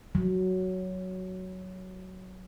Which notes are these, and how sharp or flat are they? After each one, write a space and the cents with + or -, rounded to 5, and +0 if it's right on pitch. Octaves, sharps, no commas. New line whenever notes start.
F#3 +5